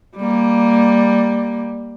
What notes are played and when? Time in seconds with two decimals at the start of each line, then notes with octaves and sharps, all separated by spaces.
0.16 G3 A#3